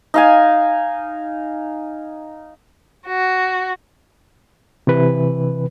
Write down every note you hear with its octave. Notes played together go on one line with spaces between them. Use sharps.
D#4 F5 G#5
F#4
C3 E3 B4